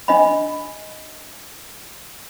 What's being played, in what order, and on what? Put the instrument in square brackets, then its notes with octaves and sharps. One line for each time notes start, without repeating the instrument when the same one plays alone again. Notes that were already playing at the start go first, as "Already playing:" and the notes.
[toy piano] D4 D#5 B5